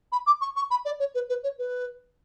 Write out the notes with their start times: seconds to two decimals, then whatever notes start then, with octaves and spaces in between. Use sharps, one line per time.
0.12 B5
0.26 D6
0.41 C#6
0.56 C#6
0.70 B5
0.85 D5
0.99 C#5
1.14 B4
1.29 B4
1.43 C#5
1.58 B4